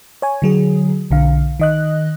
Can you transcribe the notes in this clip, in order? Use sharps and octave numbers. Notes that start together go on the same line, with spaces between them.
C#5 G#5
D3 F#3 G#4
B1 D3 F5
D#3 D#5 F#6